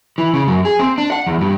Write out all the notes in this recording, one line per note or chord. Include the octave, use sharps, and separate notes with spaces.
E3
C#3
F#2
G#4
C4
D4
F#5
E2
G2